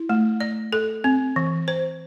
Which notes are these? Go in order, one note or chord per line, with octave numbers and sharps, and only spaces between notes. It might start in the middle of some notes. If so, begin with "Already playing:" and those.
Already playing: E4
A3
D5
A4
C4
E3
C5